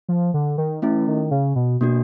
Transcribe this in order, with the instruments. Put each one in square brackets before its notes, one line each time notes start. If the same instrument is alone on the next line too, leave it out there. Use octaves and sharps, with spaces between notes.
[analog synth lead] F3
D3
D#3
[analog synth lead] E3 [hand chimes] A3 C#4 E4
[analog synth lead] D#3
C#3
B2
[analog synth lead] B2 [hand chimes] A#3 D4 F#4